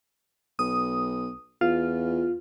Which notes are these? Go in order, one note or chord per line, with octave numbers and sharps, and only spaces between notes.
B1 D#6
E2 F4